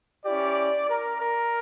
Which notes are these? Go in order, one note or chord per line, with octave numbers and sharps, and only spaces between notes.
C#4 E4 G4 D5
A#4
A#4